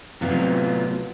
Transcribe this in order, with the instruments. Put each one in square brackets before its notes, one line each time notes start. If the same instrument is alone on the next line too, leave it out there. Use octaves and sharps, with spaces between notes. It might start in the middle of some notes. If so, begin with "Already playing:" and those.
[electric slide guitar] A2 B3 F4 [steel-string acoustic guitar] C3 F#3 C4